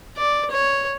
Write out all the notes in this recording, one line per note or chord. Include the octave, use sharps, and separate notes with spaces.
D5
C#5